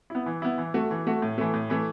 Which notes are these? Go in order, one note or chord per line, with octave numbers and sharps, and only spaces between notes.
B3 E4
E3
B3 E4
E3
A3 F#4
E3
A3 F#4
A2
E3 A3
A2
E3 A3